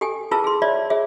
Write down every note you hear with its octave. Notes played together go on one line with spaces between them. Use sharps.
G4 A4 G5 G#5
E4 F4 G#4 B4 A5 E6
G#4 C6
F4 C#5 D5 E5
G#4 C#5 E5